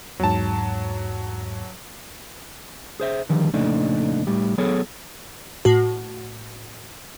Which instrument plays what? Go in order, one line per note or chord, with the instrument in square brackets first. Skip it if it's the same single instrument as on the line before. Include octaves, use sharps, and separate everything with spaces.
[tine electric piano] E2 G#2 [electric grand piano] F#3 A5
[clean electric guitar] G#4 C5 E5
D3 D#3 F3 G3
F2 A#2 C#3 A3 D4 D#4
A2 G3
F#3 B3 G#4 A4 C#5
[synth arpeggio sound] A2 F#4